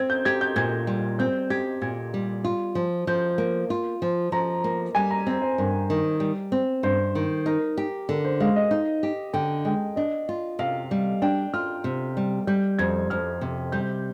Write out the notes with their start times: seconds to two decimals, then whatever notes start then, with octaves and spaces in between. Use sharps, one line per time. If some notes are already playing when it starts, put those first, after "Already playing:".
Already playing: C4 G#6
0.10 G6
0.25 G4 G#6
0.41 G6
0.56 A#2 G#6
0.87 G3
1.19 C4 G6
1.50 G4 G#6
1.82 A#2 G#6
2.14 G3
2.44 F4
2.75 F3
3.07 F3 G6
3.38 A#3
3.70 F4
4.02 F3
4.32 F3 A#5
4.64 A#3
4.95 G3 G#5
5.11 A#5
5.27 C4 C5
5.42 C5
5.58 G2 A#4
5.90 D#3
6.20 G3
6.52 C4
6.83 G2 C5
7.15 D#3
7.46 D#4 A#4
7.77 G4
8.09 D3 A#4
8.25 C5
8.40 G#3 F5
8.56 D#5
8.71 D#4
9.03 G4
9.33 D3 G5
9.65 G#3 G5
9.96 D4 D#5
10.29 F4
10.59 C3 F5
10.91 G3
11.22 D4 G5
11.54 F4 F6
11.84 C3
12.17 G3
12.47 G3 G6
12.79 F2 G#6
13.10 F2 F6
13.41 C3
13.72 G3 G6